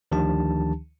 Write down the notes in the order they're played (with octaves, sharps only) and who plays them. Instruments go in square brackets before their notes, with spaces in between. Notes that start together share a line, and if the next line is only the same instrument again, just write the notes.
[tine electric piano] D2 D#3 F3 D4 G4 A5